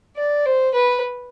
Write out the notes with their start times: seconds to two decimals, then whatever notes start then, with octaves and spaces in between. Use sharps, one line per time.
0.17 D5
0.46 C5
0.74 B4